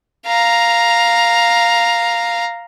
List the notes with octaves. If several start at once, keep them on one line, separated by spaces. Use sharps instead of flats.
F5 A#5